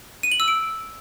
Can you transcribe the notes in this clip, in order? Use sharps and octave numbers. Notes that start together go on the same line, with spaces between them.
D#7
F#7
E6
D7